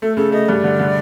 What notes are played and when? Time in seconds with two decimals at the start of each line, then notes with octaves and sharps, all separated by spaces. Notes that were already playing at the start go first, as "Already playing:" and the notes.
0.02 A3 A4
0.17 C#3 A4
0.32 A3 D#5
0.48 G2 D5
0.64 D3
0.79 D3